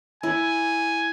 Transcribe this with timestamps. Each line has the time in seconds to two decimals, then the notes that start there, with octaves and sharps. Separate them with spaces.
0.23 E4 G#5